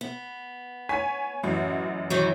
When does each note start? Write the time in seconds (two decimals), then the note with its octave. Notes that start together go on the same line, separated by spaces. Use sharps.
0.01 B3
0.89 C#5 G#5 B6
1.43 A1 F#2 F#4
2.10 D#3 E3 F#3